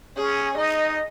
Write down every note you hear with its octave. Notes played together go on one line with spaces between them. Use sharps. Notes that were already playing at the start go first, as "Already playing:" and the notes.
C#4 G#4
D#4 D#5